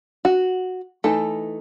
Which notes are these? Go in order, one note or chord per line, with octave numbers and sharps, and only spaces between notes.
F#4
E3 A3 D#4 A4